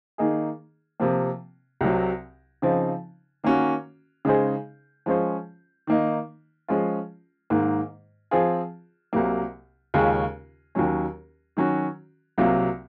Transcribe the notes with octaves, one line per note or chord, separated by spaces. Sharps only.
D#3 A#3 D#4 G#4
C3 F3 A#3
C2 C3 F#3
C#3 F3 C4 D#4
D#3 A#3 C#4 F#4
C#3 G#3 D#4 G#4 C5
F3 G#3 C#4 F4 C5
D#3 A#3 D#4
F3 G#3 C#4 F4
G#2 D#3 A#3
F3 C4 F4 G#4
C2 C3 F#3 A#3
D#2 C#3 G#3 C#4 F4
D#2 D#3 F#3 C#4
D#3 F#3 C#4 F#4
C2 C3 F#3 A#3 F4